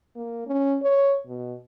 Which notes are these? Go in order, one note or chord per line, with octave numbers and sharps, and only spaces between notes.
A#3
C#4
C#5
B2